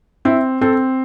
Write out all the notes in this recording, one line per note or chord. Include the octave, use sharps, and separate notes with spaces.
C4 E4
C4 A4